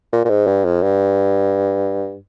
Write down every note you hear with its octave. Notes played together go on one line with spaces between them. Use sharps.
A#2
A#2
G#2
G2
F2
G2